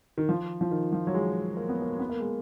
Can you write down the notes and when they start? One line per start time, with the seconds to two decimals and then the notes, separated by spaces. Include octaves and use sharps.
0.18 D#3
0.29 F3
0.61 F3
0.71 D#3
0.93 F3
1.07 F#3
1.14 G#3
1.57 A#3
1.69 B3
1.82 A#3
2.00 B3
2.10 A#3
2.20 G#3